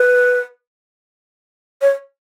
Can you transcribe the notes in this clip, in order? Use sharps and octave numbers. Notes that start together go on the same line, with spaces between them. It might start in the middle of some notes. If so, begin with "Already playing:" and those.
Already playing: B4
C#5